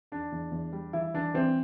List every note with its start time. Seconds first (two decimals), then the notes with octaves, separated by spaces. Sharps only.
0.12 E2 D4
0.32 E2
0.52 E2
0.73 G3
0.93 E3 E4
1.14 E3 D4
1.34 E3 C4